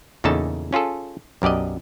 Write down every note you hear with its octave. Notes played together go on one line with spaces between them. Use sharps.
E2 A#2 C#3 D#4 A4 A5
C#4 F4 G#4 A4
B1 F#2 G4 D5 D#5